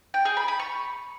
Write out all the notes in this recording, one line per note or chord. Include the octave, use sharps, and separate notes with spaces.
G5
G#4
B5
B5
C#6